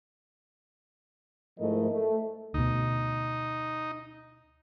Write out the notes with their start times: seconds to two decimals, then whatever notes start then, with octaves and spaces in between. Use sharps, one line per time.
1.58 G#2 F3 A3 E4 A#4 D#5
1.89 A3
2.54 D2 B2 D#4